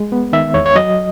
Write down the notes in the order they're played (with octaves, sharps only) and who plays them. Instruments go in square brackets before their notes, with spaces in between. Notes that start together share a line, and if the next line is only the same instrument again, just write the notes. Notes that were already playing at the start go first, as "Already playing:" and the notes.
Already playing: [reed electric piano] G#3
B3
D#3 E5
E2 C#5
C#5
F#3 D#5